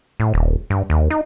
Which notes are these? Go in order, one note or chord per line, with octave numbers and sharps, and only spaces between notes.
A2
D#1
G2
D#2
D#4